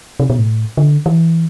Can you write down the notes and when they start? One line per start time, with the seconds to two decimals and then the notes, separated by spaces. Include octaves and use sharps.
0.20 C3
0.30 B2
0.39 A2
0.77 D3
1.06 E3